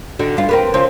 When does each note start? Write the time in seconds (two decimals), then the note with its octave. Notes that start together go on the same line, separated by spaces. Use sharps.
0.19 D3 D#4 F#4
0.37 G2 F4
0.49 C4 A#4 B4
0.74 C#3 F3 C4